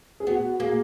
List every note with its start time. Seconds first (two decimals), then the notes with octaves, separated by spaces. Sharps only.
0.20 G#4
0.27 B3 F#4
0.60 A#3 G#4